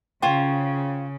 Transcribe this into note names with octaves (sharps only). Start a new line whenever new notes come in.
C#3 F4 C5 C#5 G5